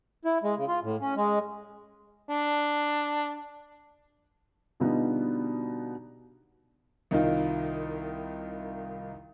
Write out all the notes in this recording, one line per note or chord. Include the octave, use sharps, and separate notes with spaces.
E4
G#3
C#3
F4
A2
C#4
G#3
D4
B2 D3 G3 B3 D#4 F4
C2 D#3 D#4 F4